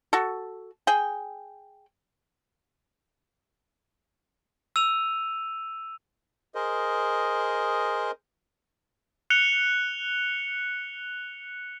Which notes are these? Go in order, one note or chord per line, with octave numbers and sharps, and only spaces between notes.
F#4 A4
G#4 G5
E6 D#7 F7
G#4 A#4 C5 D#5
F#6 C#7 F7 G7